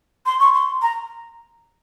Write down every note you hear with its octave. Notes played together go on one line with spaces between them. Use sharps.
C6
C#6
C6
A#5